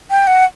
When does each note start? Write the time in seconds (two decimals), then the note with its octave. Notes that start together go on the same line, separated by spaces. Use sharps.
0.11 G5
0.27 F#5